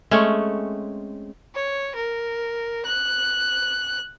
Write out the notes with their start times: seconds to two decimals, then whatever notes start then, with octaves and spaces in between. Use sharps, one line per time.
0.11 G#3 A3 C4 C#4
1.55 C#5
1.95 A#4
2.86 F#6